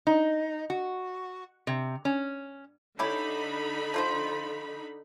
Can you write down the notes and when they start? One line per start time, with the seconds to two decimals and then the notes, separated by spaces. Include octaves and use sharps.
0.07 D#4
0.70 F#4
1.67 C3
2.05 C#4
2.99 D3 C#4 D#4 E4 G4 B5
3.94 F3 F4 C5